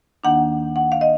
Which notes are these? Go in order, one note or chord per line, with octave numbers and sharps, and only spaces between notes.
D#2 D#3 A#3 D4 F#5
F#5
F5
D#5